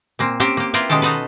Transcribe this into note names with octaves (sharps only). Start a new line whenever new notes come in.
A#2 A#3 C4
C4 C#4 G4 A#4 G5
A#3 G4
E4 F4 G4 A#4 B4
B2 D#3 G#3 C#4 G4 A4
D#4 F4 F#4 A4 B4